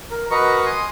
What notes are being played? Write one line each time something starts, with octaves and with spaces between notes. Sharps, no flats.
A#4
F#4 A#4 B4 D#5 A#5 C#6
G#5 C6 D#6